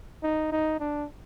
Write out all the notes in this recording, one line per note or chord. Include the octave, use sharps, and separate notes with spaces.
D#4
D#4
D4